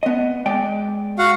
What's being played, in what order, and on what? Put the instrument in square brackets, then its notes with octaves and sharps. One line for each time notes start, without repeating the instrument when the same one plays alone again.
[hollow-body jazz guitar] B3 D#5
G#3 D5 G5
[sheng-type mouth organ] F#4 F5 F#5